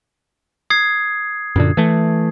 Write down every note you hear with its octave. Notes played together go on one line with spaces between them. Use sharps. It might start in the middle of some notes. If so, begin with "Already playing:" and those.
D#6 G#6 C7
F#2 A#2 D3
E3 A3